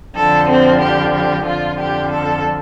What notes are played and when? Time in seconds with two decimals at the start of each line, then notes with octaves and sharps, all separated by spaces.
0.15 F2 D3 F3 A4
0.48 C4
0.80 G4
1.13 G4
1.46 F2 D3 F3 F4
1.79 G4
2.11 A4